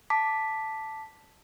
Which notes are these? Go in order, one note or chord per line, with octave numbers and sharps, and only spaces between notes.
A5 D6 B6